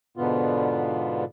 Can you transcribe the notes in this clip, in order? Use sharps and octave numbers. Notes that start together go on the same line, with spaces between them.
G#2 B2 D3 B3 F4